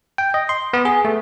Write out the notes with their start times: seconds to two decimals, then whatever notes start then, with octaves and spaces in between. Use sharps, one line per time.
0.18 G5
0.34 D#5
0.49 C6
0.73 B3
0.85 G#4
1.05 A3